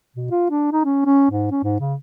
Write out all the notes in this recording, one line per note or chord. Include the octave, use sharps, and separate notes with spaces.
B2
F4
D4
D#4
C#4
C#4
G#2
C#4
G#2
C#3